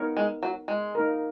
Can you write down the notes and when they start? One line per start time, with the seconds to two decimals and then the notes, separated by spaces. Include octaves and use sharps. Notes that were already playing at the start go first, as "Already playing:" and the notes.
Already playing: B3 D#4 A#4 C#5
0.17 G#3
0.43 F#3
0.68 G#3
0.95 A#3 D#4 A#4